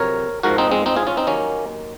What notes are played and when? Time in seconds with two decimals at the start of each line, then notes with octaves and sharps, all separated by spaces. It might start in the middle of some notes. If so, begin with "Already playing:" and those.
Already playing: F2 C3 F#3 A#4 C#5
0.43 G#2 F3 F#4 A#4
0.58 C4 D#4
0.71 G#3 C4
0.86 C4 D#4
0.96 F4 G#4
1.07 C#4 F4
1.17 C4 D#4
1.27 D#2 D#3 F#3 A#3 C#4